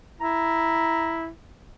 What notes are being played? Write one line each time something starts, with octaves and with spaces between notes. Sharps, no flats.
E4 A#5